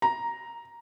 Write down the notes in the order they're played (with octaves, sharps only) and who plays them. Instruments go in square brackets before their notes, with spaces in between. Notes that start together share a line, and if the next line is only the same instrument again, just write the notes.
[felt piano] A#5